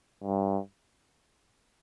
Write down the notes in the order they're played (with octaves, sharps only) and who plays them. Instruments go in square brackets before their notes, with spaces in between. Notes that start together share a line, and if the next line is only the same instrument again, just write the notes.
[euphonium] G2